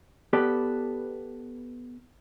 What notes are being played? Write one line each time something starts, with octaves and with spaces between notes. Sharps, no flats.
B3 G4 A4 B4 D5